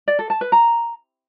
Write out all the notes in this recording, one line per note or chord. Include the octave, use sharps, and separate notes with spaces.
D5
A4
A5
B4
A#5